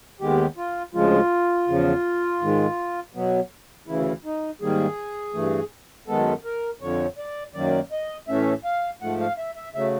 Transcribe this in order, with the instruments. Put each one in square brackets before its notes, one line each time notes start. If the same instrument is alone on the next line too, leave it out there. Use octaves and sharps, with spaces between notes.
[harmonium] D#2 D#3 G#3 B3 G4
F4
D2 C#3 F3 G#3 F4
E2 C#3 F3
G#2 D#3 G#3
B2 F#3 B3
D2 C#3 E3 E4
D#4
G#2 D#3 G3 A#3 G#4
G2 E3 A3
F#2 D#3 G#3 B3 A4
A#4
F2 D3 F3 C#5
D5
F#2 D#3 F#3 A#3 D5
D#5
A2 E3 A3 C#4 E5
F5
G#2 F3 A3 F#5
F5
E5
E5
C#3 F#3 A3 E5